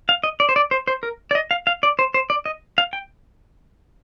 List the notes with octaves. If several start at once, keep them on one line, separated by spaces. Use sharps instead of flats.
F5
D#5
D5
C5
D5
C5
C5
A#4
D5
D#5
F5
F5
D5
C5
C5
D5
D#5
F5
G5